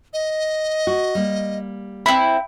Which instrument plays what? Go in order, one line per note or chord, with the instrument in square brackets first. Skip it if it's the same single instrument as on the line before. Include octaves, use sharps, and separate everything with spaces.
[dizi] D#5
[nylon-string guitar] F#4
G3 A#3
[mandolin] C4 E4 [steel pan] B5